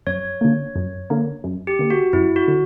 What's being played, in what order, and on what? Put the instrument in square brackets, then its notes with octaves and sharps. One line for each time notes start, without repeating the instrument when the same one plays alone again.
[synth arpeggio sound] F#2 [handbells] C#5
[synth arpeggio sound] D3 A#3
F#2
D3 A#3
F#2
[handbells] G4
[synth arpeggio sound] D3 A#3
[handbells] F#4
[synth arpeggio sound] F#2 [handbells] E4
[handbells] F#4
[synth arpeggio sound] D3